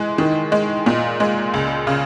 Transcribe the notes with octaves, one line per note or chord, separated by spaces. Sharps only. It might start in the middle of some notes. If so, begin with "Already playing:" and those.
Already playing: E3 G#3
D#3
G#3
A#2
G#3
C#2
C#3